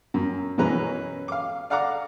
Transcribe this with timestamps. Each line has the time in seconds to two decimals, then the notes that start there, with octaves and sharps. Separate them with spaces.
0.14 F#2
0.58 F#2 B2 E3 C#4 B4 A#5
1.28 F5 D6
1.70 D5 F5 F#5 A#5 D6